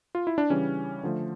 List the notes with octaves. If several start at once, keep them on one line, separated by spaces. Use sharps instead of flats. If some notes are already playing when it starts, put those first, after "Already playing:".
F4
E4
D4
C#3 E3 G3 C#4
D3 F3 A3